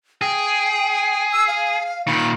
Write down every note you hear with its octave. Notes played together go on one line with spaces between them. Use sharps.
G#4 G5
E6
F5
A#2 D#3 B5